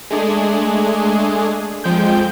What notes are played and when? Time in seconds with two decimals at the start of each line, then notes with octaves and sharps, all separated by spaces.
0.10 G#3 A3 D4 G#4
1.84 F2 F3 G#3 G5 G6